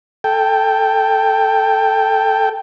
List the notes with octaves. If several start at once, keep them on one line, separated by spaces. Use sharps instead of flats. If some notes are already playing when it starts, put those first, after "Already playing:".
A4 G5